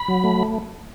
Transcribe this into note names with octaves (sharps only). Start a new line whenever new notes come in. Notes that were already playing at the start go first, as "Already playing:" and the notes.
Already playing: B5
F#3
A3